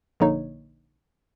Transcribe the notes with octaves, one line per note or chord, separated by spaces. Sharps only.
A#1 D3 A#3 D#4 C#5